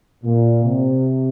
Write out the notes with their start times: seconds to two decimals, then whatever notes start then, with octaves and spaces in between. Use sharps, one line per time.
0.24 A#2
0.64 C3